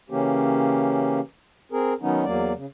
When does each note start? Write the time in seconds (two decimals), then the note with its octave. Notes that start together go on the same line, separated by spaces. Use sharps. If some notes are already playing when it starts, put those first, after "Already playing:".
0.10 C#3 E3 A#3 C#4 G4
1.72 C4 G#4 A#4
2.02 D#3 F#3 B3 C#4 D#4
2.25 E2 F#3 A#3 D5
2.55 C#3